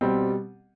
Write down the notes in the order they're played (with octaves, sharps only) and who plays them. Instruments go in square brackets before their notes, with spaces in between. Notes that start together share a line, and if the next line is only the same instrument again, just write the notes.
[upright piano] B2 G3 C4